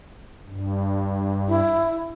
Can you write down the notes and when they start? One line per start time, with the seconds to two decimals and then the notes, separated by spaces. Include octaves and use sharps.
0.45 G2
1.48 E4